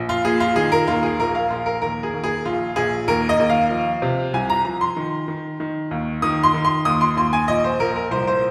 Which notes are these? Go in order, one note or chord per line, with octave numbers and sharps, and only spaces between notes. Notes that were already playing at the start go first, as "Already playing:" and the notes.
Already playing: A#1
F4
A#2 G#4
F4
D#3 G#4
A#4
D#2 F4
G#4
A#1 A#4
F5
A#1 F4
A#4
D#2 A#4
G#4
D#2
G#4
A#1 F4
A#1 G#4
D#2 A#4
D#5
D#2
F5
F3
C3
C2 G#5
A#5
F3 A#5
C6
D#3
D#3
D#3
D#2
D#3 D#6
C6
D#3
C6
D#2 D#6
C6
D#2 C6
G#5
A#1 D#5
C5
A#1 A#4
A#4
C2 C5
C5